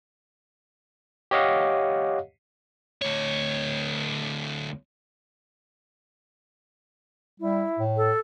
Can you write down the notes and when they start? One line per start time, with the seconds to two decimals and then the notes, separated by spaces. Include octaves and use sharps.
1.31 G4 C#5 D#5 F5 F#5
3.02 D2 C#5
7.40 G3 E4
7.79 A2
7.97 A4